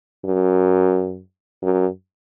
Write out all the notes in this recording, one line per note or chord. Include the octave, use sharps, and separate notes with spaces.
F#2
F#2